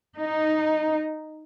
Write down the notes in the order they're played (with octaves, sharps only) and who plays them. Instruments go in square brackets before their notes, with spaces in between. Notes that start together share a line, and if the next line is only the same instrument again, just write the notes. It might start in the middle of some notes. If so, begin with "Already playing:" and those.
[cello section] D#4